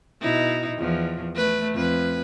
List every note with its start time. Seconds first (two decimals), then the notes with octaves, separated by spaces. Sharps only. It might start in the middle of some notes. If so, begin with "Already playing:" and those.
0.21 B2 D#4 E4
0.77 E2 F3
1.36 A3 B4
1.73 F2 B4